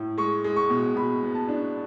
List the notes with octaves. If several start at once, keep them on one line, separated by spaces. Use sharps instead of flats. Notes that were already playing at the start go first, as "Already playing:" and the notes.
Already playing: A2
G#3 C#6
G#3
C#6
B2
B2 B5
B3
A5
D4